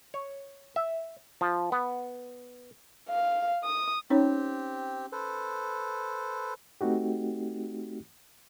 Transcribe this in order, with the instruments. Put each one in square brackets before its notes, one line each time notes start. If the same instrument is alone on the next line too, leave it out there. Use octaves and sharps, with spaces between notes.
[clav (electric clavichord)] C#5
E5
F3
B3
[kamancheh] F5
D#6
[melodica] C4 G4 [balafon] C#4 D#4 C#5
[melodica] A4 B4 C5
[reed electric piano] A3 C4 D#4 F#4 G4